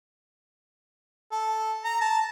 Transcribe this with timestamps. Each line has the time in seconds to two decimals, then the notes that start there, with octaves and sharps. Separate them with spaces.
1.32 A4
1.84 A#5
2.01 A5